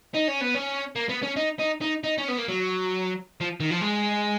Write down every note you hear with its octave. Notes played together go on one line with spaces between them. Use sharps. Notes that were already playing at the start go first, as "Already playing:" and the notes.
D#4
C#4
B3
C#4
A#3
B3
C#4
D#4
D#4
D#4
D#4
C#4
B3
A#3
F#3
F3
D#3
F3
G#3